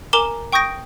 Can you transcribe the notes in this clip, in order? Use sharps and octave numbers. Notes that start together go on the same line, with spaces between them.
A#4 G#5 A#5 D6 E7 G7
G5 C#6 D#6 G6 A#6 D7